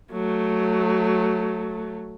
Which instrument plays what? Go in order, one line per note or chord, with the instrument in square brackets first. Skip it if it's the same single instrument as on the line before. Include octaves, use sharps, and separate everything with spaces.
[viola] F#3 A3